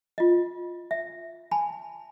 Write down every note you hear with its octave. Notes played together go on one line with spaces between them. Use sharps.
F4 D#5
E5
G#5 A5 B5